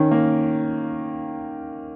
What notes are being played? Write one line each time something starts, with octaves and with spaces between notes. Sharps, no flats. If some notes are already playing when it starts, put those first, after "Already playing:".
Already playing: D#3 C#4
A#3